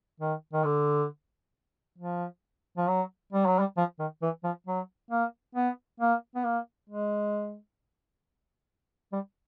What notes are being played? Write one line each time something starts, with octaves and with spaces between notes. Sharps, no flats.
D#3
D#3
D3
F3
F3
F#3
G3
F#3
G3
F3
D#3
E3
F3
F#3
A#3
B3
A#3
B3
A#3
G#3
G3